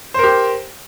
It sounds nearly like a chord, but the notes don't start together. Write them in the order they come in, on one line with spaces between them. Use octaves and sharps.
C5 A#4 G4